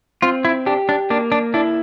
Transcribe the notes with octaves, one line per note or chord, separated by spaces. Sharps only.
C4 F4
E4
D4 G4
D4
A#3 D4
D4
D4 E4